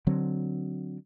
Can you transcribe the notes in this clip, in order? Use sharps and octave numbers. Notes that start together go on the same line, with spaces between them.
D3 F#3 C4